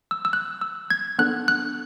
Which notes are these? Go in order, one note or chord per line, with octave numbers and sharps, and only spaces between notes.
E6
E6
F#6
E6
G#6
B3 D4 A4 F#6
F#6